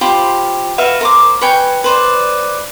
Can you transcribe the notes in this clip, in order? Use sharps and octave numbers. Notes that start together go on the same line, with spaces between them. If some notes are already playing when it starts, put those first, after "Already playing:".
F4 G4 C5 B5
F#4 B4 E5 F5
A#4 C5 D6
B4 C#5 G5 G#5
B4 C5 D5